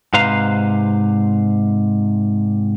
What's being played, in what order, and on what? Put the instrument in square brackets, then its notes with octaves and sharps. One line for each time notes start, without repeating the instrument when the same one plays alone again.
[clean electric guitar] G#2 C3 B4 C5 F5 A#5